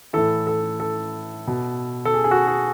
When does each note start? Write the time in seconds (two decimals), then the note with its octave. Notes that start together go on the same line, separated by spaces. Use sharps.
0.13 A2 E3 A4
0.47 A4
0.80 A4
1.47 B2
2.05 A4
2.14 G#4
2.24 G#4
2.31 F#4
2.48 G#4